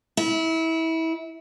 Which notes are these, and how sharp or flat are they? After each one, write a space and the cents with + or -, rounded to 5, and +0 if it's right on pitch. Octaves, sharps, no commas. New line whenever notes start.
E4 -25